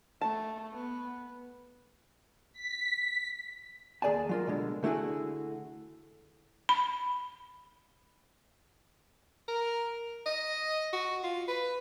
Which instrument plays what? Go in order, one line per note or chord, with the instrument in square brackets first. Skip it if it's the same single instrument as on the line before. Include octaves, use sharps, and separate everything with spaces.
[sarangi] A3 [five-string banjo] A5
[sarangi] B3
[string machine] B6
[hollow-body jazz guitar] D#2 G#4 B4 D5 G#5 A5
F#3 F4 A#4
B2 D3 G#3
D3 A3 E4 F#4 G#4
[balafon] B5
[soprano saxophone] A#4
D#5
F#4
F4
B4